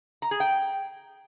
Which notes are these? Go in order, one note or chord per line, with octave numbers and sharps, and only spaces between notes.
A#5
G#4
G5